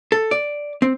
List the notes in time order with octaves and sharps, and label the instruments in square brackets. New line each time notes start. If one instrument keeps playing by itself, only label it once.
[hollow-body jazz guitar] A4
D5
C4